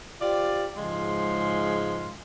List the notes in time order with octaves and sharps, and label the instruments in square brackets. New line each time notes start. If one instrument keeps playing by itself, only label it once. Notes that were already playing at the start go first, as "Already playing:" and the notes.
[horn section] F4 G4 C5 D5
G#2 C#3 F3 G#3 F5 C6